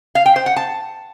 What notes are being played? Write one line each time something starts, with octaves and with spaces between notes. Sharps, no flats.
F5
G5
C5
F#5
A5